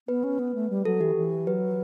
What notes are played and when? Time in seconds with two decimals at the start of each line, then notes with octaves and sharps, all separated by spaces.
0.08 B3 B4
0.24 C#4
0.39 B3
0.55 A3
0.70 G3
0.85 F#3 A4
1.00 E3 G4
1.16 E3
1.47 F#3 B4